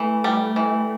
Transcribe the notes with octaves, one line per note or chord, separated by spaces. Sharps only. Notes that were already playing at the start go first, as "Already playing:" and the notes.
Already playing: E3 A3
G3
E3